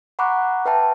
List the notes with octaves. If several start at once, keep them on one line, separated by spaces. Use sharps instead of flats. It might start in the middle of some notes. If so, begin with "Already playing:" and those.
F#5 A#5 B5 C#6 D6 F#6
B4 E5 G5 A5